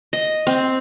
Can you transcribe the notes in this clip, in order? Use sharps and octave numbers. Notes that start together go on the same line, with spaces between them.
D#5
C4